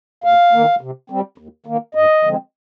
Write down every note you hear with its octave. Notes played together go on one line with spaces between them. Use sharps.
D#2 F5
D#3 A#3
C3
G3 C4
D#2
D#3 A#3
G2 D#5
D3 F3 G#3 C4